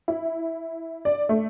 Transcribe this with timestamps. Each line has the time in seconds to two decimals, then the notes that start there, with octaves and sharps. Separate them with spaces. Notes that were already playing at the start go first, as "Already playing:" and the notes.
0.08 E4
1.05 D5
1.29 A3